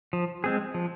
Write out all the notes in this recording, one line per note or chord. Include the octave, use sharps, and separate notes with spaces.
F3
G#3 C4 G#4
F3